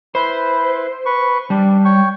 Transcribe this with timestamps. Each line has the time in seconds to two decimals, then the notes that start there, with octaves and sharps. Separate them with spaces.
0.15 E4 B4 C5
1.06 B4 C#6
1.50 G3 D4
1.85 C#5 G5 C#6